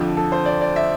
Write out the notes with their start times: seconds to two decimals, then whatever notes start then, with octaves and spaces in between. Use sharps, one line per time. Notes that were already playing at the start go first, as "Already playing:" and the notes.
Already playing: F2 D3 F3
0.17 A4
0.32 C5
0.46 D5
0.61 D5
0.76 E5